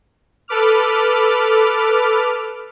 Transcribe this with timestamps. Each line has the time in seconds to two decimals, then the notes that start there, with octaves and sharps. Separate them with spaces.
0.48 A4 B4 D6 F6